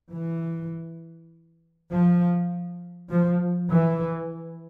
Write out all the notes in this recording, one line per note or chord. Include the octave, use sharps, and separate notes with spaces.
E3
F3
F3
E3